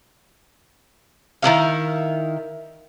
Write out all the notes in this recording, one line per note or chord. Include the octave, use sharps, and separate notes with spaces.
D#3 B3 E4 F5